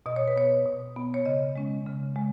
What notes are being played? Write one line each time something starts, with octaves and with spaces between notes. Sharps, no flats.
B2 D#5
C#5
B4
B3 C#5
B2
B3
C#5
C#3 D#5
G#3 C#4
C#3
G#3